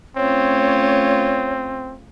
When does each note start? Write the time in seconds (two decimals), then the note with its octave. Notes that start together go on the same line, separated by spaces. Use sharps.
0.17 A3 C4 C#4 F4 C#5